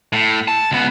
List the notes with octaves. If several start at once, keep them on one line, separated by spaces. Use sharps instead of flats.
A2
A5
C#2 B3